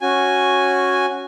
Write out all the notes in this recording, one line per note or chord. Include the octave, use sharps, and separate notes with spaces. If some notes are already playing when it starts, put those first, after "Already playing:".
C#4 F#4 G#5